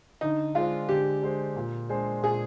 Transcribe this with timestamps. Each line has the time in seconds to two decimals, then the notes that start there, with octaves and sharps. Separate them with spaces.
0.21 D3 D#4
0.55 G#3 D4 F4 G#4 C5
0.89 D3 G4
1.22 G#3 D4 G#4 C5
1.56 A#2
1.89 G#3 D4 G#4 C5
2.22 A#2 G#4